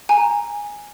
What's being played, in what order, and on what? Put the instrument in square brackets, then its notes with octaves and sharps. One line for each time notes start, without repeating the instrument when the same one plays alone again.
[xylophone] G#5 A#5